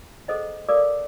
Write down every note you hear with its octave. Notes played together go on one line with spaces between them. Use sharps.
G#4 A4 C5 D#5 F#5
A4 A#4 D5 F5 D6